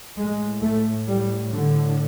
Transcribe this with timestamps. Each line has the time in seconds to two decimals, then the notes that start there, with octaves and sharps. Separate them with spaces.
0.18 A2 G#3
0.62 A3
1.07 G3
1.53 D3